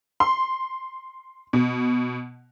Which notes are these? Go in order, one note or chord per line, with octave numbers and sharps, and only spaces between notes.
C6
B2